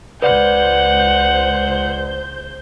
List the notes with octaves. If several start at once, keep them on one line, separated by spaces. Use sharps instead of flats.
C#2 B4 C5 D5 F#5 G6